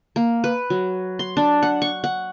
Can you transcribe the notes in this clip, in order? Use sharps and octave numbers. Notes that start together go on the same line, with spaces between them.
A#3
B4
F#3
C6
D4
F#5
C#6
F#5